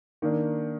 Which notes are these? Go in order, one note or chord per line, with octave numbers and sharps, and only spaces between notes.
D#3 A#3 D4